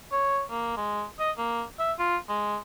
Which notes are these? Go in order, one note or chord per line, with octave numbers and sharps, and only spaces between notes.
C#5
A#3
G#3
D#5
A#3
E5
F4
G#3